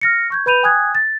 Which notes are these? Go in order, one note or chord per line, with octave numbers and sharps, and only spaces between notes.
F6 A#6 C#7
C#6 G6 G#6
B4 B5 G6 D#7 F7
G5 G#5 D#6 F#6 G#6
A6